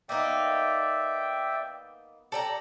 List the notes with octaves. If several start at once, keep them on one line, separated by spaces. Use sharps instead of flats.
A#3 B3 D#4 D5 E5 G5
G4 A4 D5 A#5